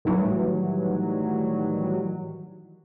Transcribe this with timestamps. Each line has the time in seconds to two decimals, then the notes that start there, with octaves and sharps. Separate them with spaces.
0.05 A2 D#3 E3 F#3 G3